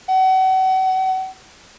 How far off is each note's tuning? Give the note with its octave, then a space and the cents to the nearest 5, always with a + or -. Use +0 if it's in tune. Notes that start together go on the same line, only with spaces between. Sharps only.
F#5 +35